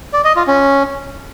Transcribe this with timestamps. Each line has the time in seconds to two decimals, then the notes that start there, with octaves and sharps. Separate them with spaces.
0.13 D5
0.24 D#5
0.36 F4
0.47 C#4